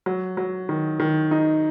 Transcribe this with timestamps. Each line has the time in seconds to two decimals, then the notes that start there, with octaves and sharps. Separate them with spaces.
0.06 F#3
0.37 F#3
0.69 D#3
1.00 D#3
1.31 D#4